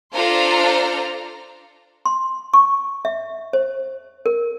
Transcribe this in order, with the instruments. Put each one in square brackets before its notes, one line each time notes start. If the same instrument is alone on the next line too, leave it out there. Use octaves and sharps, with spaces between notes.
[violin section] D4 F4 A4 C5 F5 A#5
[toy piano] C6
C#6
E5
C5
A#4